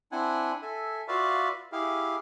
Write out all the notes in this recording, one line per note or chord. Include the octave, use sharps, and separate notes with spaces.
C4 D4 E4 F#5 G#5
A4 E5 G#5
F4 F#4 B4 D5 E5 F5
E4 G4 G#4 F5